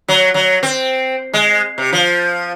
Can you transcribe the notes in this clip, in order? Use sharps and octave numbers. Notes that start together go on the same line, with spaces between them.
F#3
F#3
C4
G#3
C3
F3